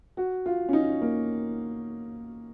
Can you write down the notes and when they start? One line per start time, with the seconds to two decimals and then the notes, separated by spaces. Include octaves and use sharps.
0.17 F#4
0.46 F4
0.69 C#4
0.73 D#4
1.02 A#3